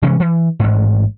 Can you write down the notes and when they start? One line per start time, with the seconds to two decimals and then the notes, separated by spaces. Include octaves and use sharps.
0.02 C3 E3 G#3 C#4
0.20 E3
0.60 A1 G#2